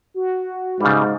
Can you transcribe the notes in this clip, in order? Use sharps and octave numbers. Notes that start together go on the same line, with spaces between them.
F#4
G#2 C#3 G3